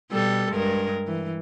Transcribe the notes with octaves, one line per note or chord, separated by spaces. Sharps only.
B2 G3 A4
G2 G#3 A#4
E3